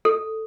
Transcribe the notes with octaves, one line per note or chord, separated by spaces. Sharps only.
A4